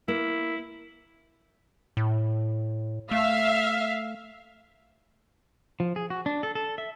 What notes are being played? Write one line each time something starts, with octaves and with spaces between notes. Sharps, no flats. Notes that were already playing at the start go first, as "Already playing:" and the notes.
A#3 E4
A2
A3 E5 F5
F3
G#4
F#4
D4
A4
A4
E5